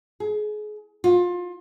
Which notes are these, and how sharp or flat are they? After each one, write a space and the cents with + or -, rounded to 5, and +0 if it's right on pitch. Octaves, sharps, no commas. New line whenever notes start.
G#4 +30
F4 +25